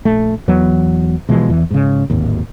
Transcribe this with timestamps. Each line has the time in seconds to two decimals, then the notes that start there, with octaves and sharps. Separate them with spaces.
0.05 A#1 A3
0.48 E2 E3 F#3 B3
1.29 B2 E3 F3 G#3
1.50 E2 E3
1.70 G#2 C#3
2.10 D1 G#1 D#2